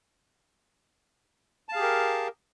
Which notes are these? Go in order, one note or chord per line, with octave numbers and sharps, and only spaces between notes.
G4 G#4 A#4 F5 A5